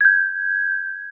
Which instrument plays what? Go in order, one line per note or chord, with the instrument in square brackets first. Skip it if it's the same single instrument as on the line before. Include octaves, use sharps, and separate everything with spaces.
[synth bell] G6 G#6